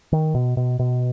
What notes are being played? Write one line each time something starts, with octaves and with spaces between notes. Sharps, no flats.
D#3
B2
B2
B2